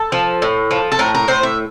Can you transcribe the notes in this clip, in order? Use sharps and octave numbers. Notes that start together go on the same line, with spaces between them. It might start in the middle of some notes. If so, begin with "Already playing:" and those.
Already playing: A4
F3
A2
F3
A4
A2 A#4
A#4
A2 C5
E5